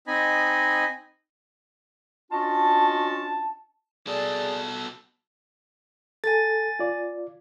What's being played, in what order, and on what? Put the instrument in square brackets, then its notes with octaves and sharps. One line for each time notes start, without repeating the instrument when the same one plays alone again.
[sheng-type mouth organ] C4 D#4 D#5 G#5 B5
[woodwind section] C#4 D4 F4 F#4 D#5 A5
[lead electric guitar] B2 A4 [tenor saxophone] G#4 [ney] D5
[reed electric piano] A4 [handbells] G#5 A6
[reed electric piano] F4 D5